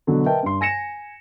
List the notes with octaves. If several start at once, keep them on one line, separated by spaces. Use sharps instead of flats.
B2 D3 F#3
A#4 B4 D#5 E5 G5 A5
G2 C6
G#5 A#6 C#7 E7